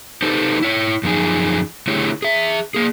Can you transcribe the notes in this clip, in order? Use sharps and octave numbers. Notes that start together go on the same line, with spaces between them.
D#4 G4 A4 B4 C5
E4 C#5
F#2 F3 D#4 G#4
D3 A3 E4 G4 G#4 C#5
G#4 E5
A#3 G#4